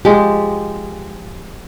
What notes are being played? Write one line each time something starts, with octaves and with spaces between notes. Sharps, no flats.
F3 G#3 G4